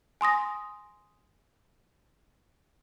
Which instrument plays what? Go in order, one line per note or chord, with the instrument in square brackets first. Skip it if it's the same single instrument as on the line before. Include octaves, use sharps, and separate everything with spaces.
[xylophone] G#5 C6 D#6 A#6